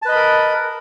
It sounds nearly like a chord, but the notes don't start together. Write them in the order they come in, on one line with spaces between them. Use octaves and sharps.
A5 B4 D#5 B5 A#4